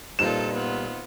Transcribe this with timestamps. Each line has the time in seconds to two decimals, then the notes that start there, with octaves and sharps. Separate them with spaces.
0.19 G2 A#2 C4 D#4 F4 A4 E7
0.53 B3 F4